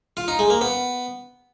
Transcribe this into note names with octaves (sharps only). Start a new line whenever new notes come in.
F4
D#4
G#3
A#3
B3